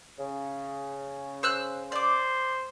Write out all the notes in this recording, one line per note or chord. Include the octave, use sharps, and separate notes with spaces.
C#3
C5 E6 F#6
C5 D5 D6